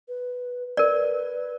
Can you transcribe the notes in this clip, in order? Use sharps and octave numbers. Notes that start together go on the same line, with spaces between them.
B4
A#4 B4 D5